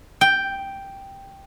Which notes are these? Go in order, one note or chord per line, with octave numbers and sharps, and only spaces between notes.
G5